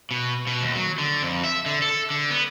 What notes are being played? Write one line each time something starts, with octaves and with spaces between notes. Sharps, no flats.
B2
B2
D#2
F#3
D3
F2
E5
D3
A4
D3
B3